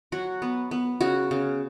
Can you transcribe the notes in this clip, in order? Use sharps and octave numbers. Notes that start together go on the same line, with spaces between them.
F#3 F#4
B3
B3
C#3 F#4
C#3